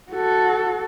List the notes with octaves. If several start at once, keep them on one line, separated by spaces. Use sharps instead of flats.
F#4 A4